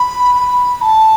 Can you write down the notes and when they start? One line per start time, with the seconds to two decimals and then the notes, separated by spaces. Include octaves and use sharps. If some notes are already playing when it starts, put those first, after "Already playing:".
Already playing: B5
0.35 B5
0.82 A5